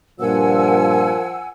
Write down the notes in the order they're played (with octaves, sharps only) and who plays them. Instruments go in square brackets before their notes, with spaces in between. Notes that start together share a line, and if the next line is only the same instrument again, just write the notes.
[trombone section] G2 A#2 [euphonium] F3 [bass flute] A#4 [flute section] F#5 G#5 E6